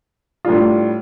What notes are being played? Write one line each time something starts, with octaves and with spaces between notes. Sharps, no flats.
A2 G3 D4 F4